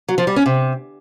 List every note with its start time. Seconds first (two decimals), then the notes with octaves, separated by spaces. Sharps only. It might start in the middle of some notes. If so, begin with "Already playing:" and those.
0.08 F#3
0.18 F3
0.27 G3
0.36 C#4
0.46 C3